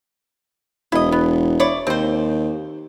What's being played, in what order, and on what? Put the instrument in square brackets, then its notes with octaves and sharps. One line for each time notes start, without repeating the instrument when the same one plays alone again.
[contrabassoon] E1 [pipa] E4 D#5
[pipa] B3
E4 C#5 D5
[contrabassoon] D#2 [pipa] C4 C5